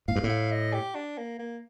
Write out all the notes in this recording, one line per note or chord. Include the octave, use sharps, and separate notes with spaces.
A2 F5
G2
A2
F5
D#5
G4
D4
A#3
A#3